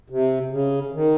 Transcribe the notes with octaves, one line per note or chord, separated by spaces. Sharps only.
C3
C#3
D#3